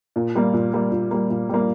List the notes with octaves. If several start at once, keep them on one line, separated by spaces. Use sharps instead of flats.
A#2
G3 A#3
A#2
G3 A#3
A#2
G3 A#3
A#2
G3 A#3